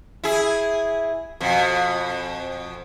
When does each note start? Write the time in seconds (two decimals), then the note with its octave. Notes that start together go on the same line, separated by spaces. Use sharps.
0.24 E4 G#4
1.41 F2 B2